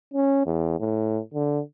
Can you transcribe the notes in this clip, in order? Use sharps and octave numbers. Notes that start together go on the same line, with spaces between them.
C#4
E2
A2
D3